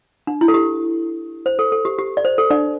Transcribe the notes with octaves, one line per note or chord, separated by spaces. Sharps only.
D4
E4
A4
G4
C5
A4
A4
G4
G4
D5
C5
A4
D4 D5